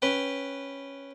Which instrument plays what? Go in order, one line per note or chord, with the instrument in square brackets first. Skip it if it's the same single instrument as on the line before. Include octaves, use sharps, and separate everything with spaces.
[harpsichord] C#4 B4 G5